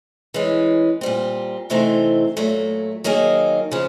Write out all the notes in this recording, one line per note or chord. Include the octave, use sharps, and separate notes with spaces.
E3 G#3 C#4
A#2 G3 C4
C3 E3 A3 C4 D#4
A#2 F#3 A3
D#3 F#3 A#3 D#4 G#4
C#3 F3